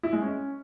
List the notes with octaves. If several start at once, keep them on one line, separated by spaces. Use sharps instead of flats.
E4
G#3
C#4